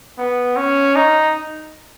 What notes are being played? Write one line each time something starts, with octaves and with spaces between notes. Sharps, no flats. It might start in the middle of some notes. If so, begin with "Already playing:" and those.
B3
C#4
D#4